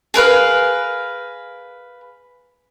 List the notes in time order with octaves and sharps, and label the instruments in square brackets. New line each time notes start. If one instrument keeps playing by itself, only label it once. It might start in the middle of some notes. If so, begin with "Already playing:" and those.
[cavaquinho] G#4 A#4 B4 F5